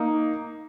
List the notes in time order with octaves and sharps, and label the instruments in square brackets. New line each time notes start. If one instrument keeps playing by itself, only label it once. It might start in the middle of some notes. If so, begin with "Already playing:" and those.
Already playing: [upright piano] A#3 D#4